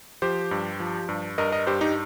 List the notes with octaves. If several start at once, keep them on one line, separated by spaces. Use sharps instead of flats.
F3 G4 C5
G2
F3
G2
G2 A#4 D#5
A#4 D#5
G2 G4 C5
D#4 G4